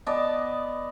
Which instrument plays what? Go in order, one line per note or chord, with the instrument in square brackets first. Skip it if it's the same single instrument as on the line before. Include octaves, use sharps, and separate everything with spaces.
[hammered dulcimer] B3 D5 D#5 A5